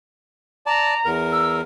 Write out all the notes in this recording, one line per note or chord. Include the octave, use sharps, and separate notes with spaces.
D5 A5 A#5
E2 A#4
E6